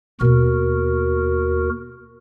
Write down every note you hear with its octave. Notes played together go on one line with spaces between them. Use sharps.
D#2 B2 B3 F#4 A#4